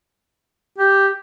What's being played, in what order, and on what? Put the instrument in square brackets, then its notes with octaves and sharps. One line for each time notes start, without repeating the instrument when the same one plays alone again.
[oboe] G4